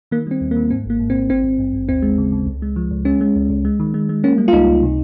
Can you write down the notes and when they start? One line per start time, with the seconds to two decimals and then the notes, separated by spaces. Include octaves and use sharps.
0.11 D#3 A#3
0.27 G3 C4
0.41 D#2
0.51 A#3
0.56 D#3
0.71 G#2 C4
0.86 G#1 A#3
1.00 G#2
1.10 C4
1.15 G#1
1.29 G#1 C4
1.44 G#1
1.59 G2
1.73 G#1
1.88 D#2 C4
2.02 G#3
2.18 C#3
2.32 C#3
2.46 C#2
2.62 G#3
2.76 F3
2.91 C#2
3.05 G#3 C#4
3.21 G#3
3.36 C#2
3.50 C#2
3.65 G#3
3.80 D#3
3.94 G#3
4.09 G#3
4.24 A#3 C#4
4.38 G3
4.48 F4
4.53 C#2 D#4
4.68 C#2
4.82 C3